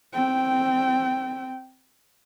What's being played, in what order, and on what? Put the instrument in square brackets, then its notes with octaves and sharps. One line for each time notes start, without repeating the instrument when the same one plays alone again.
[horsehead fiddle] C4 G5